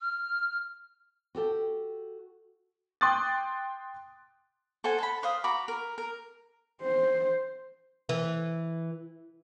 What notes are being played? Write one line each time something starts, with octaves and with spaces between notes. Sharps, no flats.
F6
F#4 G4 A4 G5
G5 C6 D6 D#6 F#6 A6
A4 C5 F#5 G#5
A4 A5 B5
B4 C5 F5 D#6
F#4 A#5 B5 D6
A#4
A#4
C5
E3